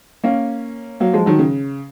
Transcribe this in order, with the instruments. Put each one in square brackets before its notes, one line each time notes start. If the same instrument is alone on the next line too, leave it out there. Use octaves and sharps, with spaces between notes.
[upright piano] A#3 C#4
F#3 A#3
F3 G#3
D#3 F#3
C#3